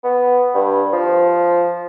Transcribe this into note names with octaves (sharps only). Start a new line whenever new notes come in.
B3
G2
F3